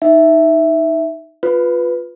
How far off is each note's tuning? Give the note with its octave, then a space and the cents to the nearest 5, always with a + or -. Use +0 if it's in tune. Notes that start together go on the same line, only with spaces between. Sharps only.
D#4 +5 E5 +0
F4 +15 B4 +0